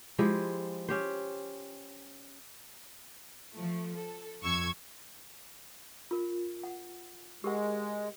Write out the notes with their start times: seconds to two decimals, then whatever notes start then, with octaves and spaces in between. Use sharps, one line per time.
0.19 F3 G#3 E4 G4
0.89 C#4 G4 C5
3.53 F3 A3
3.95 A4
4.42 F2 C#6 E6 G#6
6.11 F4 A#4
6.64 F#5
7.44 G#3 G4 A#4 F#5